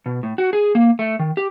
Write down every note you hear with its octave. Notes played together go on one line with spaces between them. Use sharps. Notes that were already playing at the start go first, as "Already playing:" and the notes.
B2
A2
F#4
G#4
A#3
A3
D#3
G4